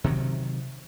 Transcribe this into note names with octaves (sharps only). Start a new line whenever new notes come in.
C3 D#3 F3 F#3